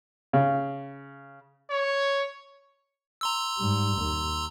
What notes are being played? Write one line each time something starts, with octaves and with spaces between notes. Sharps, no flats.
C#3
C#5
A#5 C6 E6
G#2 G3
D#2